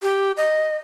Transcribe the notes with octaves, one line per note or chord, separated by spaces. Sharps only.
G4
D#5